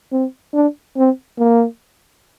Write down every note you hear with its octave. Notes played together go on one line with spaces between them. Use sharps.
C4
D4
C4
A#3